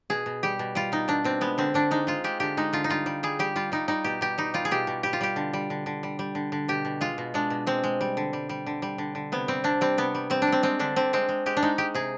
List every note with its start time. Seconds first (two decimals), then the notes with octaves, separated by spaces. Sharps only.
0.10 B2 G#4
0.26 B2
0.43 G3 G4
0.59 B2
0.75 G3 F4
0.92 B2 D#4
1.08 B2 D4
1.24 B2 C4
1.41 G#3 B3
1.58 D3 C4
1.74 D3 D4
1.91 G#3 D#4
2.07 G#3 F4
2.24 G#3 G4
2.40 D3 G4
2.57 G#3 D#4
2.73 D3 F4
2.84 D#4
2.89 G3 F4
3.06 G3
3.23 G3 G#4
3.39 G3 G4
3.56 G3 F4
3.72 G3 D#4
3.88 G3 D#4
4.04 B2 G4
4.21 B2 G4
4.38 G3 D#4
4.54 G3 F4
4.65 G#4
4.71 B2 G4
4.87 B2
5.03 G3 G4
5.13 F4
5.21 G3 G4
5.36 D3
5.53 G3
5.70 D3
5.86 D3
6.03 G3
6.19 G3
6.35 D3
6.52 D3
6.68 B2 G4
6.85 B2
7.01 G#3 F4
7.18 B2
7.34 G#3 D4
7.50 B2
7.67 G#3 C4
7.84 G#3
8.01 G3
8.17 D3
8.33 G3
8.49 G3
8.66 D3
8.82 G3
8.98 D3
9.15 D3
9.32 C3 B3
9.48 G3 C4
9.64 C3 D4
9.81 G3 C4
9.98 C3 B3
10.15 G3
10.30 G3 C4
10.42 D4
10.47 G3
10.52 C4
10.63 G#3 C4
10.79 D3 D4
10.96 D3 C4
11.13 G#3 C4
11.29 G#3
11.46 G#3 G4
11.57 D4
11.62 G#3 D#4
11.78 G#3 G4
11.94 C3 G#4